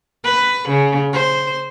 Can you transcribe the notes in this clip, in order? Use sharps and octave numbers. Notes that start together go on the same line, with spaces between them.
B4
C#3
C5